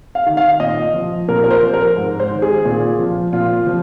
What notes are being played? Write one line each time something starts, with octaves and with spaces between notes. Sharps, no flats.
F5
D#3
F5
A#2 D#5
F3
A#2 A#4
A#4
C5
F3
A#4
G#2
C5
D#3
G#4
A#2
F3
A#2 F4
F3